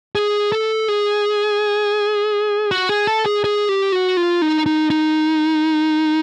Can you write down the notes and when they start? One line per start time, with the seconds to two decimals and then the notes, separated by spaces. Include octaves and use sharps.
0.15 G#4
0.52 A4
0.89 G#4
2.71 F#4
2.89 G#4
3.07 A4
3.26 G#4
3.44 G#4
3.69 G4
3.92 F#4
4.17 F4
4.42 D#4
4.66 D#4
4.90 D#4